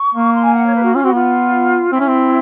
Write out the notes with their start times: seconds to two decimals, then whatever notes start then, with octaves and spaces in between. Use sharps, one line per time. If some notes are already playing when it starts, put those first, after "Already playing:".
Already playing: C#6
0.14 A#3
0.34 C6
0.43 G#5
0.54 F#5
0.64 C#5
0.74 B4
0.83 F#4
0.93 C#4 F4
1.03 C4 F#4
1.12 B3 F4
1.92 C4 E4
2.00 C#4
2.07 C4